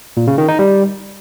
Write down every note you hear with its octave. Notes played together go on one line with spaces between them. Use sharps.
A#2
C#3
D#3
D#4
G3